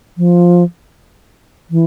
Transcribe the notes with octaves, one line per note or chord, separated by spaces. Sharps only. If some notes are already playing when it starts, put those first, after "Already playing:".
F3
E3